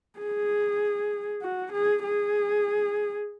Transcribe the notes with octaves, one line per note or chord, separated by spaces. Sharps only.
G#4
F#4
G#4
G#4